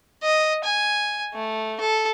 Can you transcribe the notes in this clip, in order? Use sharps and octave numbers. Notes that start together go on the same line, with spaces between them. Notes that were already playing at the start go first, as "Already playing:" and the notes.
D#5
G#5
A3
A4